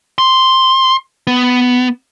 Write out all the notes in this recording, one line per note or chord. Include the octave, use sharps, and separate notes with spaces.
C6
B3